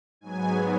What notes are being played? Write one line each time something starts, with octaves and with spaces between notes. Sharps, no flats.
G#2 F#3 B3 G#5